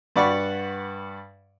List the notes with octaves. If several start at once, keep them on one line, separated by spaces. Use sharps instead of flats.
G2 D5 F#5 B5 C#6